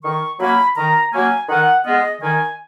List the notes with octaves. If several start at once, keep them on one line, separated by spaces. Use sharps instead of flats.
D#3 C#6
F#3 A#3 C#4 B5
D#3 A#5
F#3 A#3 C#4 G#5
D#3 F#5
G#3 B3 F4 D#5
D#3 G#5